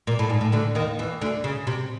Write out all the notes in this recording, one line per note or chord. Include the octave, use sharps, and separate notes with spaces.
A#2
A2
G#2
A2
D2 D3
D#2 D#3
E2 E3
D2 D3
C#3
C3